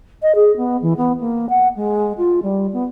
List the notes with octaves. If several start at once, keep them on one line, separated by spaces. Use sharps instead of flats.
D#5
G#4
B3
E3
B3
A#3
F#5
G#3
F4
G3
B3